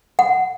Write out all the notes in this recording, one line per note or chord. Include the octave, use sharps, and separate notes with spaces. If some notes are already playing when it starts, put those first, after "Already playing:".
F#5